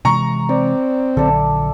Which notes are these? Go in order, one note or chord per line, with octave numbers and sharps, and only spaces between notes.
C3 E3 G#3 A#5 C#6
C4 D5
A#1 D3 F#3 A4 D5 E5